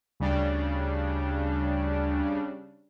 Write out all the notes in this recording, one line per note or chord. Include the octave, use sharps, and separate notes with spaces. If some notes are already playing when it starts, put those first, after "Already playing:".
D2 C#3 G3 D4